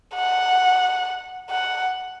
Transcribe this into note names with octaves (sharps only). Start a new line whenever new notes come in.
F#5
F#5